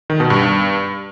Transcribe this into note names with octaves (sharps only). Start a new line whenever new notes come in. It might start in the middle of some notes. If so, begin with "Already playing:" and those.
D#3
B2
G2